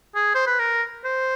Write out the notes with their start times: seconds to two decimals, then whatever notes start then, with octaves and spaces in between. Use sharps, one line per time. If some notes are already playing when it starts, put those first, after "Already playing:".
0.15 G#4
0.35 C5
0.47 B4
0.59 A#4
1.05 C5